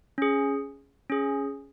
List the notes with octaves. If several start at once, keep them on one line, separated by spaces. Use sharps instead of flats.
C#4 G#4
C#4 G#4